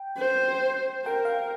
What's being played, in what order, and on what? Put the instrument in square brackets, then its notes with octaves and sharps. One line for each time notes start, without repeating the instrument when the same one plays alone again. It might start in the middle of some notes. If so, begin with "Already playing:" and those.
Already playing: [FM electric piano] G5
[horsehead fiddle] C5
[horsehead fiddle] A#4 [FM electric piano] G5
[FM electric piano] F5